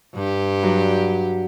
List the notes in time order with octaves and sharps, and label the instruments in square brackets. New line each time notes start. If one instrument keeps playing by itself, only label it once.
[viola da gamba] G2 G4
[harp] F#3 D5